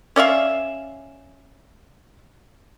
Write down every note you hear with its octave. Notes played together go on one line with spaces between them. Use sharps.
C#4 D5 E5 F5